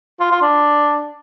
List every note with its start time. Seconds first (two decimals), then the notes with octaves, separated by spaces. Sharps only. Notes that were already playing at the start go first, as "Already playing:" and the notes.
0.20 F4
0.31 F4
0.42 D4